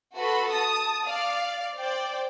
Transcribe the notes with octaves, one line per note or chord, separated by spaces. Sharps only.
F#4 A4 B4 B5 C6
A5 D#6
D5 F5
C5 D5 G5